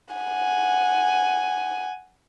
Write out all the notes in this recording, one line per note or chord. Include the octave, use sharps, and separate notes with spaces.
F#5 G#5